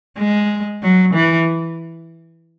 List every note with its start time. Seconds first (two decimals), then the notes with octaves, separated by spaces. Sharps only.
0.18 G#3
0.82 F#3
1.14 E3